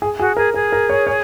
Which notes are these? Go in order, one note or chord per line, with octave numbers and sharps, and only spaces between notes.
G#4
F#4 G#4
G#4 A#4
G#4 A#4
A#4
C#5
C#5